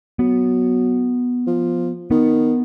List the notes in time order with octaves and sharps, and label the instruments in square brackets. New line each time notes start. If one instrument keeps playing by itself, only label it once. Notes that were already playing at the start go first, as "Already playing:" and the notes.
[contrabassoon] F#3 [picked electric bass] B3
[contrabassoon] F3
[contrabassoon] D#3 [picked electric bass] B3